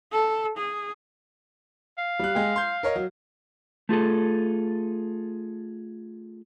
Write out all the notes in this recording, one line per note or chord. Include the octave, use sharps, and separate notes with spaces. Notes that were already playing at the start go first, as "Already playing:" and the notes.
A4
G#4
F5
G3 F#6
G#3 G#4 G5
C6 G6
A#4 C#5 D#5
F#3
A3 F4 G#4 A4